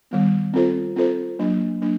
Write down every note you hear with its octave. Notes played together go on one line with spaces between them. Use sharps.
D#3 G3 B3
C4 F4 A4 C5
C4 F4 A4 C5
F#3 A#3 D4
F#3 A#3 D4